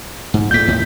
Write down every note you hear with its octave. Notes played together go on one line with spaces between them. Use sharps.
G#2
D2 A#2 A3 G6 B6
D#2 A2